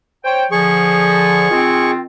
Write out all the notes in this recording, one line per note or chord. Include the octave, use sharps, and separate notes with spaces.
C5 C#5 G5
D3 F3 G#4 C#6
D#3 C4 F4